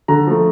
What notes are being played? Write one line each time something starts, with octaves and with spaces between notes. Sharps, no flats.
D3 A#5
F3 A3